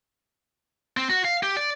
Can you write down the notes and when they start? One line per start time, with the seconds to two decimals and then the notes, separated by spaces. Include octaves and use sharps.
0.97 C4
1.10 F#4
1.25 F5
1.43 G4
1.57 D5